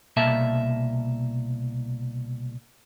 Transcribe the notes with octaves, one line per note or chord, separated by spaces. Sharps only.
C2 B2 A#3 E5 A5